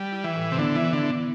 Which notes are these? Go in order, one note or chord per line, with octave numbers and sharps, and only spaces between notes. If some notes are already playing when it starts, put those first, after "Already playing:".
Already playing: G3
E4
E3
A2
C3
D3 B3
E3
E4
D3
B3